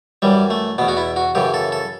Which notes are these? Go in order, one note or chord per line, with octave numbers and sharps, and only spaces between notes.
F#2 E3 G3
A3
E2 B2 B3
F#4
E4
F#4
F#2 C#3 E3 G4
A4
A4